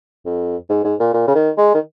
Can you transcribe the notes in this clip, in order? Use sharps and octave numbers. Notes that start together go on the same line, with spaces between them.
F2
G#2
G#2
A#2
A#2
C#3
D#3
G#3
D#3